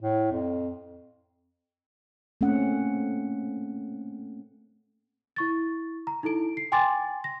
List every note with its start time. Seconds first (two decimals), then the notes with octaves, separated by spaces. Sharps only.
0.02 A2
0.32 F2
2.41 A3 A#3 C4 C#4 F#5
5.36 E4 C#6 A6
6.07 A#5
6.23 D#4 E4 A4 D7
6.57 C7
6.72 G5 G#5 C6 D6 A6
7.24 A#6